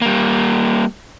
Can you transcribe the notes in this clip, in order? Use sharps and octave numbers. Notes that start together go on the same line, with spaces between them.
G3 A#3